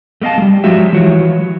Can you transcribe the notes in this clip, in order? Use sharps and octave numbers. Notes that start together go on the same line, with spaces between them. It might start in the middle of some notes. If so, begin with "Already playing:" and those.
A3 B3 D#5 F5 A5
G3 G#3
F3 F#3 G#3 F#4 G4 E5
E3 F3 F#4 C#5